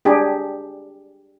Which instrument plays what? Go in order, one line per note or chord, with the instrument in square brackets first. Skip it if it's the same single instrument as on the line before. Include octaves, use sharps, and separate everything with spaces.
[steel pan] D4 G4 G#4